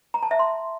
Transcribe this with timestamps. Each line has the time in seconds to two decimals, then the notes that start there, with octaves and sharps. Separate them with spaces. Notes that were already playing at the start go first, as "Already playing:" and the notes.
0.14 A#5
0.23 A5
0.31 E5
0.39 C6